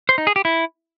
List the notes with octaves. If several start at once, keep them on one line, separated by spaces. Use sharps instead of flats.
C5
D#4
G#4
G4
E4